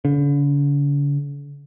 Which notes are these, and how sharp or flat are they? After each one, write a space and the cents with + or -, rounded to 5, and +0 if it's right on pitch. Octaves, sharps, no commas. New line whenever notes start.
D3 -45